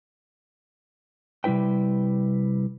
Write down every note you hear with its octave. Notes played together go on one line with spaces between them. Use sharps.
C3 G3 C4 E4 B4 G5